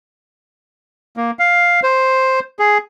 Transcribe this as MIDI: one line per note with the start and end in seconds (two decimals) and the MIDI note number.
1.17 1.31 58
1.39 1.80 77
1.83 2.40 72
2.59 2.78 68